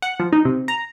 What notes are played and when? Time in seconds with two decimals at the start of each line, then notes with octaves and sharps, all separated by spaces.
0.02 F#5
0.20 F3
0.33 D#4
0.45 C3
0.68 A#5